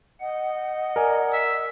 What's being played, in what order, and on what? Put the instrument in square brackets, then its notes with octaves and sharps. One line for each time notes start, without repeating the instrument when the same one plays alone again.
[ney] D#5 [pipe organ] F#5
[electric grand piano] A#4 D5 G#5
[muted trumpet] E5